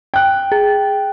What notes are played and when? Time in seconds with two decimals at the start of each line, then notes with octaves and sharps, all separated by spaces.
0.14 G5 F#6
0.52 G#4